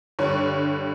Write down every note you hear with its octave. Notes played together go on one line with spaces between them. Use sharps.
G2 D3 C#5